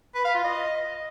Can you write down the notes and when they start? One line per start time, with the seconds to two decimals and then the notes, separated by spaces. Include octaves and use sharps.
0.15 B4
0.25 F5
0.34 F4
0.44 D#5